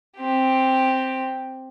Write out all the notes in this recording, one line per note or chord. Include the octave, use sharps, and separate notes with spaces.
C4 G4